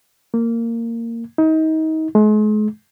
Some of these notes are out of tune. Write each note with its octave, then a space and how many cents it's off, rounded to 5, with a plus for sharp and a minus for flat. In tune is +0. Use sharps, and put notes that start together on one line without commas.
A#3 -15
D#4 +30
G#3 +40